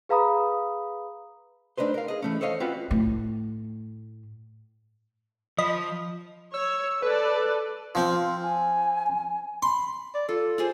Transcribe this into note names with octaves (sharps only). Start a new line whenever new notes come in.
G#4 B4 F5 A#5 B5 D#6
A3 D4 D#4 B4 C5
A#4 F5
G#4 D#5
E3 A3 C#4
A4 C5 C#5 D#5 F5
C4 C#4 F4 F#4 B4 D5
A2
F3 D#5 B5
C#5 E6
A4 B4 D5
F3 C4 F4
G#5
B5 C6
D5
F4 A4
F4 G#4 C5